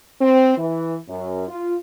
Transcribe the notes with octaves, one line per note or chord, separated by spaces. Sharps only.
C4
E3
F#2
F4